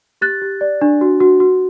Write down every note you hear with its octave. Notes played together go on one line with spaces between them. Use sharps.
G4 F#6 A6
G4
D5
D4
F#4
F#4
F#4